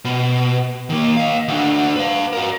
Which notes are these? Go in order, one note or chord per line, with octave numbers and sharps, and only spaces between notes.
B2
D#3 A#3
D#5 F5
D2 D3
B4 F5
F#4 A#4